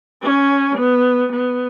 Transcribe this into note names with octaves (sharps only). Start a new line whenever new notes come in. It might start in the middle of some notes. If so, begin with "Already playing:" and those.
C#4
B3
B3